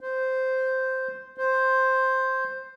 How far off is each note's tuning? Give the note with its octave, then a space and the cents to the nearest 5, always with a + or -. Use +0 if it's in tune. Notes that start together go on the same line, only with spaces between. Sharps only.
C5 -5
C5 +5